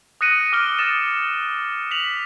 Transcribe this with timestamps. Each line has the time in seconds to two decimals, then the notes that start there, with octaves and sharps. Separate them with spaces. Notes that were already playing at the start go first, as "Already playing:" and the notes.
0.21 D#6 F#6 A#6 C#7 D#7 F#7
0.52 D6 F6 A#6 D7 D#7 G7
0.79 D#6 A6 A#6 E7
1.91 B6 F7 F#7